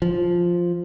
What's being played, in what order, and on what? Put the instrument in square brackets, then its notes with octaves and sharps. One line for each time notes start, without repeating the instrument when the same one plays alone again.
[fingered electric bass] F3